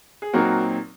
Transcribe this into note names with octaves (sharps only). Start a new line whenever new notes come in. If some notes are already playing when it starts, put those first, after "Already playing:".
G#4
A#2 F#3 C4 D#4 F#4 A#4